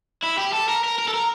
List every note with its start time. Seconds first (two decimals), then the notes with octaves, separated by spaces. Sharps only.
0.24 E4
0.38 G4
0.53 A4
0.69 A#4
0.84 A#4
0.99 A#4
1.08 A4
1.14 A#4